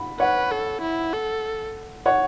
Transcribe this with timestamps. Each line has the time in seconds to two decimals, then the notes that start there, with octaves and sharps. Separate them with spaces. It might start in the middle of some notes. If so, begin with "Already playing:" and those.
Already playing: F#5 B5
0.20 B4 C#5 F#5
0.51 A4
0.82 E4
1.13 A4
2.06 C#5 F#5